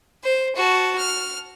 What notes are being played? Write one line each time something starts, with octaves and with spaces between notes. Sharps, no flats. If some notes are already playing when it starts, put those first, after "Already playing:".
C5
F#4 A5
F6